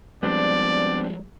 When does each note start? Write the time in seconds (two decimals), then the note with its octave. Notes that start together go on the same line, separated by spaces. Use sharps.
0.23 F3 G3 G#3 B3 C4 D4 D5